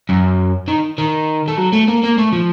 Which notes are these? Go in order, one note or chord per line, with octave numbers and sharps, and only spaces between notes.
F#2
D#3
D#3
A3
F#3
A3
A#3
A#3
A3
F3